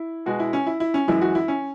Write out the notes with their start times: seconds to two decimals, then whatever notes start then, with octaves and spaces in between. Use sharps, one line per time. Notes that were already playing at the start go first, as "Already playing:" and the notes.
Already playing: E4
0.26 B2 G#3 F#4
0.40 E4
0.53 C#4
0.67 E4
0.80 E4
0.94 C#4
1.07 F#2 E3 G#3 E4
1.21 F#4
1.35 E4
1.48 C#4